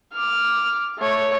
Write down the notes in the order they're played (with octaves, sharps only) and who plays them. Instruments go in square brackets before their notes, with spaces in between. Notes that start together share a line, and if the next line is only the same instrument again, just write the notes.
[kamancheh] D6 F6
A3 C#5